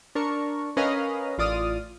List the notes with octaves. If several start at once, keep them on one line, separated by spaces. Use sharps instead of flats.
D4 A#4 C#6
C#4 A#4 B4 D#5 F5
A1 F4 D5 D#6 F6